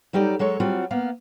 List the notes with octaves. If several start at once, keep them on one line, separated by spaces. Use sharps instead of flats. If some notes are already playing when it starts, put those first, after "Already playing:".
F#3 G3 D#4 G4 A4 D5
F#3 G#3 A4 C#5
F#3 G3 C4 F4 F#4
A#3 B3 F5